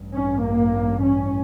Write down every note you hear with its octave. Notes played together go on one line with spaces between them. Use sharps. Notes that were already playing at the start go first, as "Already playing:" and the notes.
Already playing: A1 G2
C#4
A#3
C#4